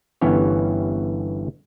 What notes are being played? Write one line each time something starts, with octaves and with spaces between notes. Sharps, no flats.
G1 G2 E3 B3 C#4 C#5